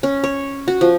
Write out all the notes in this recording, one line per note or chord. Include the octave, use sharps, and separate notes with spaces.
C#4
C#5
F#4
F3